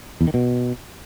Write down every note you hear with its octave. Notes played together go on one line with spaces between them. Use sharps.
E2
D#3
B2